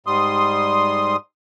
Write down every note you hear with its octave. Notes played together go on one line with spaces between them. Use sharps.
G#2 G3 C6 D#6